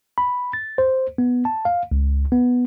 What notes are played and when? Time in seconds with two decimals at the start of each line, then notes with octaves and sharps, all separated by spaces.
0.18 B5
0.53 A6
0.78 C5
1.18 B3
1.45 A5
1.65 F5
1.91 C#2
2.32 B3